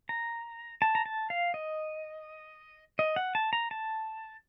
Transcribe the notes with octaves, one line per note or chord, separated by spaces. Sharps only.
A#5
A5
A#5
A5
F5
D#5
D#5
F#5
A5
A#5
A5